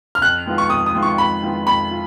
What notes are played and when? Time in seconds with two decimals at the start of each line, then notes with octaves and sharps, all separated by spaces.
0.15 F6
0.22 F2 F#6
0.46 D#3 G#3 B3 F4
0.58 C#6
0.70 F2 D#6
0.86 D#6
0.94 D#3 G#3 B3 F4
1.02 C#6
1.18 F2 B5
1.43 D#3 G#3 B3 F4
1.67 F2 B5
1.91 F4